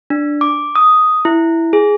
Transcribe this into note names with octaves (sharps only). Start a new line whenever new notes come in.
D4
D6
D#6
E4
G#4